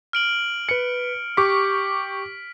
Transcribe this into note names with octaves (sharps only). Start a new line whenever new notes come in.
F6 D7 F#7
B4 C#7
G4 C#6 D6 B6